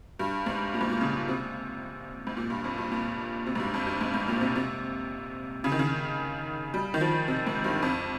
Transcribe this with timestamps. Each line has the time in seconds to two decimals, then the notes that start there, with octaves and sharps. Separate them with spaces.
0.19 G2
0.46 G#2
0.74 A#2
0.81 G#2
0.90 A#2
1.01 C#3
1.28 C3
2.27 G#2
2.37 A#2
2.50 G2
2.64 F2
2.78 G2
2.91 A#2
3.47 C3
3.55 G#2
3.60 G2
3.74 F2
3.87 G2
4.01 G#2
4.14 G#2
4.28 A#2
4.41 C3
4.56 C3
5.64 C#3
5.72 D#3
5.79 C#3
6.74 G3
6.94 D#3
7.01 F3
7.28 C3
7.47 G#2
7.64 G2
7.82 F2